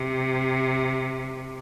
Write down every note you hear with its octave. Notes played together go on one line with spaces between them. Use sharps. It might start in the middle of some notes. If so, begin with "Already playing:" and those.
Already playing: C3